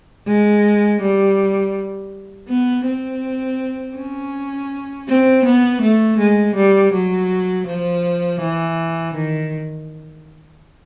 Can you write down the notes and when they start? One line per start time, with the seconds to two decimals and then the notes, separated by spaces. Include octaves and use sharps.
0.27 G#3
1.01 G3
2.49 B3
2.86 C4
3.97 C#4
5.08 C4
5.45 B3
5.82 A3
6.19 G#3
6.56 G3
6.93 F#3
7.67 F3
8.41 E3
9.14 D#3